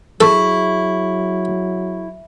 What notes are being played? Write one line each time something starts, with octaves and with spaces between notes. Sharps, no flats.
F#3 E4 G#4 A4 C#6